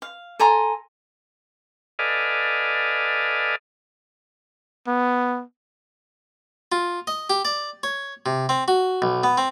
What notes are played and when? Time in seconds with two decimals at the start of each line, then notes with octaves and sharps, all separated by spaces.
0.02 F5
0.39 A4 G#5 A#5 C6
1.99 A4 B4 D5 D#5 F5 G#5
4.88 B3
6.72 F4
7.07 D#5
7.30 G4
7.45 D5
7.83 C#5
8.26 C3
8.49 C4
8.68 F#4
9.02 B1
9.24 B3
9.38 C4